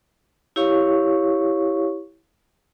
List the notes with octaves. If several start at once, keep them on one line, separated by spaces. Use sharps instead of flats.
E4 G4 C#5 F5 C#6